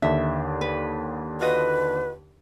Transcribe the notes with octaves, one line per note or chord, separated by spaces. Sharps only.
D#2 D3 D4 E5
B4
F4 F#4 B4 D#5